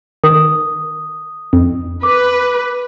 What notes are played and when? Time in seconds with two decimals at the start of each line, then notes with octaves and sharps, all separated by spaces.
0.24 D#3 D#6
1.53 F2
2.03 B4 D6